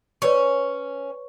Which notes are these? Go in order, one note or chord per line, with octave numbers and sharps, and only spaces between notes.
C#4 B4 C#5 C#6